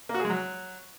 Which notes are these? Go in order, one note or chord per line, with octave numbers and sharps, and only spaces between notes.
A#3
F#4
G#4
G#3
F#3